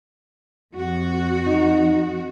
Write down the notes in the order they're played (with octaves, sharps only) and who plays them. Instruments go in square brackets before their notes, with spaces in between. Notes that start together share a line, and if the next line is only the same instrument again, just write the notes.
[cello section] F2 F#4
[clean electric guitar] D#4